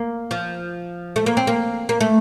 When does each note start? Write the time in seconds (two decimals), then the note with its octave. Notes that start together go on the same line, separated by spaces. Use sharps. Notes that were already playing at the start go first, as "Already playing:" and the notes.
Already playing: A#3
0.31 F3
1.16 A3
1.26 A#3
1.37 C4
1.47 A#3
1.89 A#3
2.01 A3